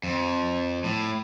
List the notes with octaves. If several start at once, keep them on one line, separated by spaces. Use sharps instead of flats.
F2
A2